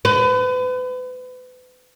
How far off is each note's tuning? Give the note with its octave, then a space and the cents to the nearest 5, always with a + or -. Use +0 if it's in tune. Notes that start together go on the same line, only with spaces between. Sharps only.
B4 +35